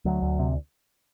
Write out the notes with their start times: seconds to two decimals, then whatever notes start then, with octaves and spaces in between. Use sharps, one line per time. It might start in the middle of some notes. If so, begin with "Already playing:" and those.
0.05 D2 F#3
0.22 D2
0.39 C3